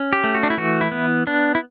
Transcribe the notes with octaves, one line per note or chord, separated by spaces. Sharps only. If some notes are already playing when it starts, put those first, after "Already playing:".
Already playing: C#4
G4
A3
F#4
D4
E4
E3 F#4
E4
B3
B3 D4
E4